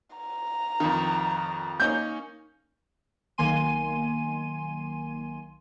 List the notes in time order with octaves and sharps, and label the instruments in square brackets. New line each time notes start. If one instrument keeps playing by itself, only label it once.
[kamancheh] A#5
[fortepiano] F2 D#3
[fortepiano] A#3 C#4 D#4 [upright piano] G6
[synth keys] B1 D#3 A#3 G#5 C6 D#7